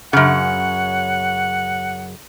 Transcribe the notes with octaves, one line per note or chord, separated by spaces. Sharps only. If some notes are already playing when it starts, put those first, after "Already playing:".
F#2 C#3 F#5